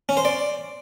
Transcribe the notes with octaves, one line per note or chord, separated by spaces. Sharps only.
C#4
C5
D5